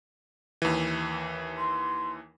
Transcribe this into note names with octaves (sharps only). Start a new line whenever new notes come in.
D#2 E3
C6